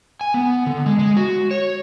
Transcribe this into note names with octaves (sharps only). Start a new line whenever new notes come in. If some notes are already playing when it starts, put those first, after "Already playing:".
G#5
B3
D3
G#3
G#3
F#4
C#5